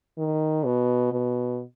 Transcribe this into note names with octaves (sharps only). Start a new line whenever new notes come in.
D#3
B2
B2